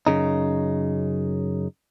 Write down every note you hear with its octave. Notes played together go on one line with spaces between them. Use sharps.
F#2 C#3 D#4